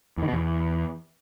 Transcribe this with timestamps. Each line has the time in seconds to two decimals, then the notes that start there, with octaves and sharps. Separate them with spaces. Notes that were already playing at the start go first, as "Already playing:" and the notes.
0.17 E2
0.23 D#3
0.28 B2
0.33 E2